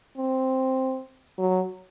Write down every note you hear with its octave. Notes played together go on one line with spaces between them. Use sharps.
C4
F#3